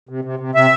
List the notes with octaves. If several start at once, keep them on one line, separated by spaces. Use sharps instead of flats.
C3
C3
C3
C3 E5